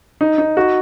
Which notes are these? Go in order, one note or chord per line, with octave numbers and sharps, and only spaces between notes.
D#4
D#4
F#4